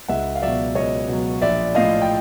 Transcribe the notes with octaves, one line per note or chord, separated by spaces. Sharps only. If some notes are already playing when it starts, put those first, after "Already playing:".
C#2 E5 F#5
F5
B2 F#3 D5 E5
C#2 C#5 D#5
B2 F#3
A#1 D5 E5
A2 F3 D#5 F5
G5